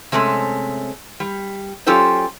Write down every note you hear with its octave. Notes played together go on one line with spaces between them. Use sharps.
C3 G#3 A3 C4 C#4
G3
F#3 C#4 F4 G4 A4 C5